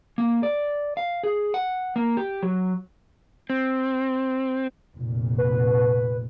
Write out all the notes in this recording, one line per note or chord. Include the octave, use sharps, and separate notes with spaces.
A#3
D5
F5
G#4
F#5
A#3
G4
F#3
C4
F1 A#2
B4